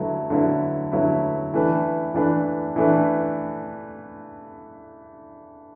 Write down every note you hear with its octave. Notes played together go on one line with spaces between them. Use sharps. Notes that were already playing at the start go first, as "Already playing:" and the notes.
Already playing: D3 F#3 A3 E4 B4
D3 F#3 A3 E4 B4
D3 F#3 A3 E4 B4
E3 A3 D4 B4
E3 A3 D4 B4
E3 A3 D4 B4